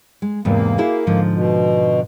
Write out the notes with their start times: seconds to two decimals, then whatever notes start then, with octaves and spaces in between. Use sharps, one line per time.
0.22 G#3
0.45 E2 G#2 C3 A#3
0.78 E4 F#4 G#4
1.07 G#2 D3 F3
1.33 B2